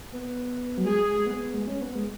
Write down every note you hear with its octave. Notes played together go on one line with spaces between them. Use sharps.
B3
F#3
G#3 G#4
G#3
B3
B3
G#3
C#4
B3
G#3